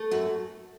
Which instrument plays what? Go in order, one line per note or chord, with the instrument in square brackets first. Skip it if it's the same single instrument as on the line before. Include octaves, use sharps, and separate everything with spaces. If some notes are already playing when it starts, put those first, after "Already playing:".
Already playing: [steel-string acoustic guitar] A3
F#2 F#4